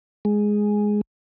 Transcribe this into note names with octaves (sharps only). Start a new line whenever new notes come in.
G#3